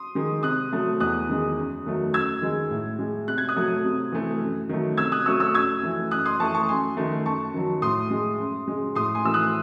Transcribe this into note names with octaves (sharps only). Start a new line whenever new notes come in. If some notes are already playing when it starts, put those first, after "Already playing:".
Already playing: C6 D#6
D#3 G#3
C3 D#6 F#6
F#3 A3
E2 D#6 F#6
D#3 G#3
F#2
D#3 F#3 A3
F#2 E6 G#6
D#3 G#3
A2
G#3
C3 F#6
G#6
D#6 F#6
F#3 A3
C3
E3 A3
F#2
D#3 F#3 A3
C3 E6 G#6
D#6 F#6
F#3 A3 C#6 E6
C#6 E6
F#2 E6 G#6
E3 A3
F#2 D#6 F#6
C6 D#6
E3 A3 A5 C#6
A5 C#6
F#2 G#5 C6
D#3 A3
F#2 A5 C#6
D#3 F#3
A2 C6 D#6
G#3
F#2
C#3 G#3
A2 C6 D#6
G#5 C6
E3 A3 E6
D#6 F#6